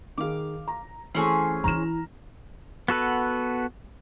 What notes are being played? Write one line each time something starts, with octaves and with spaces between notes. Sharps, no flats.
D#3 G#4 F5 D6
A#5
E3 A3 C4 C#4 G#4
E3 E4 A#5 F6 E7
B3 F#4 A4 B4